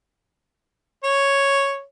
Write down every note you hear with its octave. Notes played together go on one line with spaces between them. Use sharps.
C#5